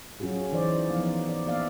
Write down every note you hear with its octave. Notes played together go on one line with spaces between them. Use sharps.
F#3 C#4 F4 F#4 G#4
E3 D#4 C5 D5
F3 B3 D#4 F5
D5
A#3 B3 D5 E5 F5